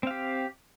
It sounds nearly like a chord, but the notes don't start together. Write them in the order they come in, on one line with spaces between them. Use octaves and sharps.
C4 F5 G4